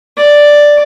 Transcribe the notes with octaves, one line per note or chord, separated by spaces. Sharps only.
D5